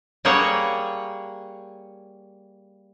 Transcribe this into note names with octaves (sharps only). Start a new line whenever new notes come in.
G3 A#3 G#4 C#5 F#5